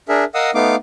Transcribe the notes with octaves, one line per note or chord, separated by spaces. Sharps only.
D4 G#4 A#4 E5
A#4 D#5 F5 F#5 D#6 E6
A3 B3 D#4 F5 D6